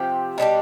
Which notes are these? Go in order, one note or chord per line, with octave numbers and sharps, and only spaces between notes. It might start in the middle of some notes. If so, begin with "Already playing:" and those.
Already playing: C3 F3 C4 G4
B2 G3 D4 G4